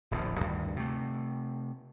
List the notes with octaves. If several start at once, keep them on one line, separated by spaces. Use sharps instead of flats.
D1 A#1 E2 F3
D2 G2 D#3
C3 A3